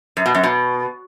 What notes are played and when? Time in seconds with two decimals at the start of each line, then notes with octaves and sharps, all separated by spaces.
0.17 F#2
0.26 B2
0.35 F#2
0.43 B2